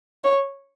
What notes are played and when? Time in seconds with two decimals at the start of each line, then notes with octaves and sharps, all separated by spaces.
0.24 C#5